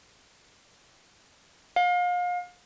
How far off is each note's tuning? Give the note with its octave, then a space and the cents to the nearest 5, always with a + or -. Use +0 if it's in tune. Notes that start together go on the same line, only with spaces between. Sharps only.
F5 +35